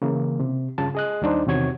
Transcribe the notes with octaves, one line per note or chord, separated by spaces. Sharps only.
C#3 E3 A#3
C3
G2 C#3 F4 A5
G#4 D#5 F#6
D#2 G3 D4 D#4 C5
E2 C3 D#3 F#4 C#5 G#6